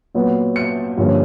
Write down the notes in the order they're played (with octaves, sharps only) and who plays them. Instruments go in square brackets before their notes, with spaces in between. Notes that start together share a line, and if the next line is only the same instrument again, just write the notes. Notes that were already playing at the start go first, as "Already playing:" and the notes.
[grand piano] A#2 F#3 B3
C#7
G2 D3 F3 A#3 C#4